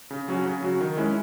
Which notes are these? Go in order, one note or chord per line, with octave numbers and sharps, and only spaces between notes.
C#3
F#3 C#4 F#4
C#3
F#3 C#4 F#4
D#3
G#3 C#4 E4